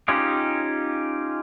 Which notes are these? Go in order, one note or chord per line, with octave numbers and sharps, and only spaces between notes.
C#4 D#4 F4 G4 G#4